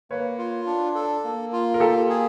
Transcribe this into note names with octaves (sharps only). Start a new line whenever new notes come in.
A#3 B4 C#5
F4
D4
A4
A#3
F4
A#4
A#3 G4 A4
G#4